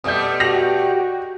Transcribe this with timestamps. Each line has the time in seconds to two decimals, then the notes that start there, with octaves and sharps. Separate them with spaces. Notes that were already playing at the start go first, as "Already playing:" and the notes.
0.04 B2 G3 A3 D#6 G6
0.40 F#4 G4 A#6 F7 F#7